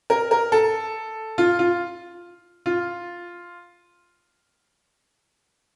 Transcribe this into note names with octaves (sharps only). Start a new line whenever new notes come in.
A#4
A#4
A4
F4
F4
F4